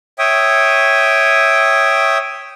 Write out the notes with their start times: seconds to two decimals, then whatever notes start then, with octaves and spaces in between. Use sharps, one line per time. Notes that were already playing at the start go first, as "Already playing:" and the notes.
0.19 C#5 E5 G5 D#6